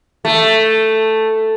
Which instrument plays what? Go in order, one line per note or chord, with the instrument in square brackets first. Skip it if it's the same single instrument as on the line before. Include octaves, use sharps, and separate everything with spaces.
[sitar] A3